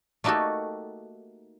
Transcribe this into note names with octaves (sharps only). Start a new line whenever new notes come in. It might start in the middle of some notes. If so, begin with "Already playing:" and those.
A3 A#3 D#4 F#4 G4 A4